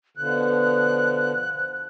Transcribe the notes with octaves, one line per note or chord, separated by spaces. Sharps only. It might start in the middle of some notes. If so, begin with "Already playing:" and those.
B2 D3 F3 F#6